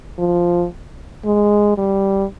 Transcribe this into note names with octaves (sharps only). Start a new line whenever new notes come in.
F3
G#3
G3